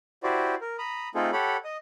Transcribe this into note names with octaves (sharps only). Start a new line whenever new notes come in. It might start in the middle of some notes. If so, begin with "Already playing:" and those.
E4 F#4 G4 C5 D5
A#4
A#5 B5 D#6
A3 C4 D#4 F4 G#4 A4
G4 A4 C#5 F#5 B5
D#5 D#6